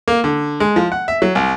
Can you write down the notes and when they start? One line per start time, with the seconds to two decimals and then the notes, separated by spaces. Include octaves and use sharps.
0.08 A#3
0.24 D3
0.60 G#3
0.76 F3
0.92 F#5
1.08 E5
1.22 F#3
1.35 C2